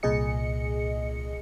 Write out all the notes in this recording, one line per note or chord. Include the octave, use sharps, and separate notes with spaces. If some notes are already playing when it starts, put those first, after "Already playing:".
C2 A#2 G#4 D#5 C#7